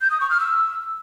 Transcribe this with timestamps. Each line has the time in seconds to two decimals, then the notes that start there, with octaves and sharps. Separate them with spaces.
0.01 G6
0.11 D#6
0.20 C#6
0.30 F6
0.40 E6